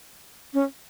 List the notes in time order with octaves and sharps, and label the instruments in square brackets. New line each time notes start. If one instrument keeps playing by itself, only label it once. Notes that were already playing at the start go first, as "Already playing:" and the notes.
[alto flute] C#4